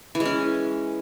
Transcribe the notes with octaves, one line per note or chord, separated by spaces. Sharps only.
E3
G#3
C#4